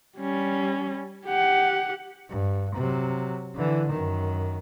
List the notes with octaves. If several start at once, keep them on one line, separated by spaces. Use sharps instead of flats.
G3 C#4
G4 F#5
G2
C3 F#3
D3 E3
F#2 D#3